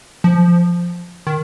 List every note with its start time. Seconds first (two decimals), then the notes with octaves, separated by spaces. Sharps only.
0.24 F3
1.27 D#3